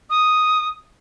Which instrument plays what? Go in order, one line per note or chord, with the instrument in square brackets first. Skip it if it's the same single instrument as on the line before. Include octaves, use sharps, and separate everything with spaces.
[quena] D#6